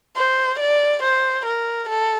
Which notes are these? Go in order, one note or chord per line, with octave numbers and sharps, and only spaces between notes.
C5
D5
C5
A#4
A4